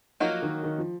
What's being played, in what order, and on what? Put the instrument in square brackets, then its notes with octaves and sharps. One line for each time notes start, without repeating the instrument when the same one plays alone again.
[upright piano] F3 [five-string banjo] F#3 A#3 D#4 F#4 A#4
[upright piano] D#3
D#3
F3